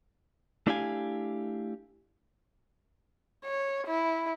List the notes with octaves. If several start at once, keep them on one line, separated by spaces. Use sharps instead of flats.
A3 D4 E4 G4 F5 G#5
C#5
E4